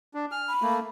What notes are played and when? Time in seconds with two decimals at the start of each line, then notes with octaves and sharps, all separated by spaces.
0.14 D4
0.32 G#5 F6
0.47 B5
0.62 A3 A#3